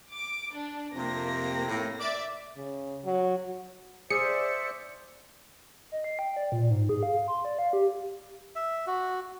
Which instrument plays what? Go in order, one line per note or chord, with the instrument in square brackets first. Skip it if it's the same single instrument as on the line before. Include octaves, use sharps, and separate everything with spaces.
[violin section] D6
D4
[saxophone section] F2 C3 [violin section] A#3 A#6
[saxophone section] A2
[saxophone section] D5 [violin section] E5
[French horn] C#3
F#3
[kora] G#4 [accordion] C5 D5 E5 [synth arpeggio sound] C#7
[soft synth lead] D#5
C7
G5
D5
A#2
G#2
G#4
F5
C6
D5
F5
G4
[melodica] E5
F#4